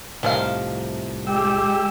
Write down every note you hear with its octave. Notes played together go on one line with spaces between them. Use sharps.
C2 A2 D#3 F3 F5
G#3 G4 G5 E6